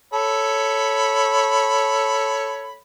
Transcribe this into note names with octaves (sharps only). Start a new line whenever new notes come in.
A4 C#5 B5